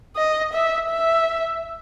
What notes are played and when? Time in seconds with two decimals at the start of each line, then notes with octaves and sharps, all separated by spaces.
0.16 D#5
0.53 E5
0.89 E5